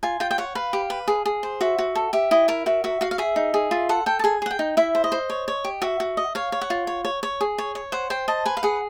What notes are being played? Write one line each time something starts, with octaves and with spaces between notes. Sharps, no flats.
F4 G#5
F4 G5
G5
C#5 F#5
B4 F5
G4
B4
G#4
G#4
C5
F#4 E5
F#4
A4
G4 E5
E4 D#5
A#4 E5
F#4 E5
F#4 E5
F#4 F5
F5
G#4 E5
D#4
G#4
F4 E5
A4 F#5
A4 G5
A5
G#4 G#5
G#4 F#5
G5
D#4
E4 E5
C5
D#5
C5
C#5
C#5
G4
F#4 E5
F#4
D#5
C#5 F5
C#5
F#5
F4
C#5
C#5
C#5
G#4
C#5
C#5
C5 F#5
C5 G5
D#5 A5
B4 G#5
F5
G#4 F#5